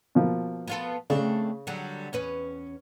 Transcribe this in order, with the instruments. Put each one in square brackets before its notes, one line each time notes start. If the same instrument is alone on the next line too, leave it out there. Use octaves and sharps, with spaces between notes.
[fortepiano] B2 F3 A#3
[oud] B3 F4 A4
[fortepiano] C#3 [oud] A3 C4 D4
[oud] D3 F#3 G3
E2 C#4 B4